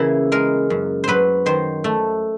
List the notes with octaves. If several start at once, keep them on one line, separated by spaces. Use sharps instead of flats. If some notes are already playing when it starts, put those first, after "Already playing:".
Already playing: C#3 E3 A#3 E4
G#3 A#4
F#2
F#3 B4 C5
D#3 C5
A3